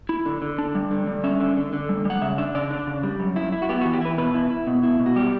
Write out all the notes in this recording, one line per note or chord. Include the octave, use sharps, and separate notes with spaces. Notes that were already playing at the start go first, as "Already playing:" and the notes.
E4
D3
D3
D4
G3
D3
G3
C#4 E5
D3
D3
D3
G3
G3 F#5
C#3 E5
D4 E5
C#3 D5
D4
C#3
G3
F#2
E4
E4
F#4
B3 G4
F#4
E3
G4
E4 B4
B2 B4
E4
E4
B2
E4
B2
F#4
G3 G4